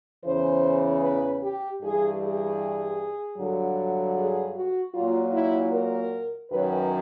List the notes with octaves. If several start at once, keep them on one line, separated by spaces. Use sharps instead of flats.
E2 C#3 E3 C5
B4
G4
G2 E3 G3 G#4
G#4
G2 D3 F#3
G#4
F#4
A#2 F#3 F4
E4
A#4
F#2 D#3 F#3 B4